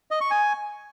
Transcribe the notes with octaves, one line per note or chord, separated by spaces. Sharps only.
D#5
C#6
G#5